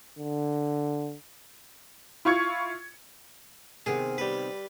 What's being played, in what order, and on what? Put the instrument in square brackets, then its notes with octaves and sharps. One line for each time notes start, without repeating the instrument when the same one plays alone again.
[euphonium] D3
[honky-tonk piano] E4 F4 C#6 G#6 C#7
[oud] C3 D#3 B3 [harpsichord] G#4
[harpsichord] G3 B4